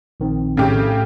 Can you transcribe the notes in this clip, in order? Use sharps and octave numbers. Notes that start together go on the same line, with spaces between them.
A#1 D#3 C4
A2 C#3 G4